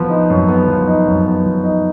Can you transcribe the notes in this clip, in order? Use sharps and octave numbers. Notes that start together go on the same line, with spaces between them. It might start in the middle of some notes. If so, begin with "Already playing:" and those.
Already playing: F3 B3
D#4
F#2
B3
F3
D#4
F#2
B3
F3
D#4